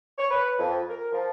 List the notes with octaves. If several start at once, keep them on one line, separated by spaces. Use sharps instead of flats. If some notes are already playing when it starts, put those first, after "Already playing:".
C#5
B4
F2
A#4
F3